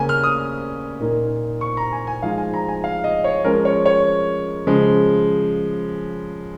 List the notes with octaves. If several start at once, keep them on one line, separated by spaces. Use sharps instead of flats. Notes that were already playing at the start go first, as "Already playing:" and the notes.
Already playing: C#3 A#3 C#4 G#5
F6
D#6
A#2 A#3 D#4
C#6
A#5
G#5
G#5
F3 G#3 D#4 F5
G#5
A#5
G#5
F5
D#5
C#5
F3 G#3 C#4 A#4
C#5
C#5
C#3 F3 G#3